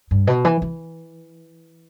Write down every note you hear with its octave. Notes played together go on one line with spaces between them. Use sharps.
G2
B2
E3
E3